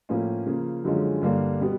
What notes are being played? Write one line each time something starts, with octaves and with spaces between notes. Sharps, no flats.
A2 F3 A#3 C#4
C#3 F3 A#3
F#2 D3 F3 G#3 C#4
G2 D3 G3 A#3 D4
B2 G3 B3